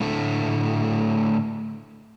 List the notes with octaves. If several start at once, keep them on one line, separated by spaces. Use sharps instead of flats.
A2 D3 A3